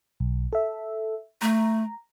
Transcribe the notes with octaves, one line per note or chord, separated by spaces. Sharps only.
B1
A4 E5
A3 A#5